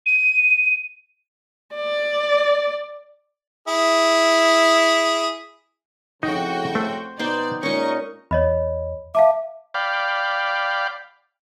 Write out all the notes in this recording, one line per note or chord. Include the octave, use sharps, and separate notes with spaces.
D#7
D5
E4 G#4
F2 A2 C#3 D#4 F#4 G5
A3 C5
B2 B3 D#4 C5 D5 G5
A#2 G#3 C#4 D#4 A#4 D#5 C#6
E2 C#5 D#5 B5
E5 F5 A5 D6
D5 F5 G5 B5